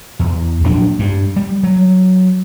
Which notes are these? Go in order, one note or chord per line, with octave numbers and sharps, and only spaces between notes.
E2
A#1 F#3 D4
G2
G3
F#3